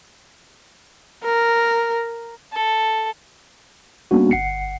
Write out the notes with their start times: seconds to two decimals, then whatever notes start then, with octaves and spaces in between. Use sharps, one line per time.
1.24 A#4
2.53 A4
4.11 G3 A#3 B3 C#4 D4 F#4
4.31 G1 F#5 C7 C#7